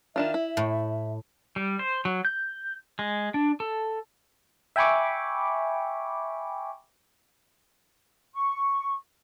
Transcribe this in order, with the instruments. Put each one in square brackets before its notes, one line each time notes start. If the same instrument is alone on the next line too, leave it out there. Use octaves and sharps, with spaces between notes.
[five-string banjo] D#3 D4 F4 [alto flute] E5
[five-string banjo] E4
[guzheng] A2
[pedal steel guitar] G3
C5
F#3
G6
G#3
D4
A4
[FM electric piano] E5 G5 G#5 B5 C#6 D6
[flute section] C#6